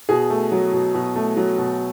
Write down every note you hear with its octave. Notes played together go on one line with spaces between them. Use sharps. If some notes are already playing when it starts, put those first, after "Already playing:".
B2 G#4
A3
F#3
B2
B2
A3
F#3
B2